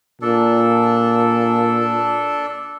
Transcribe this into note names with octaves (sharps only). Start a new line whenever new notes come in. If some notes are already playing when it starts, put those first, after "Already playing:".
A#2 D4 A4